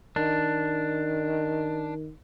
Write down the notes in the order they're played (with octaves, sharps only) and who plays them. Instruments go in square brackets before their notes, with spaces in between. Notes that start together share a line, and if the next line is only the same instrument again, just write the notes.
[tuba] D#3 [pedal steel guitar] D4